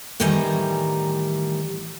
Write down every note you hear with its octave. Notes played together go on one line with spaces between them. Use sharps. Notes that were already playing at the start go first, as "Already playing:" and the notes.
A2 D#3 E3 G3 G#5 A#5